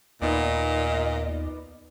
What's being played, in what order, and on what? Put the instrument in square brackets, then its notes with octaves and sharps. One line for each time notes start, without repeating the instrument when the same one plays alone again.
[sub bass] D#2 [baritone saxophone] A#2 [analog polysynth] B3 D#4 D5 [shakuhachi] D#5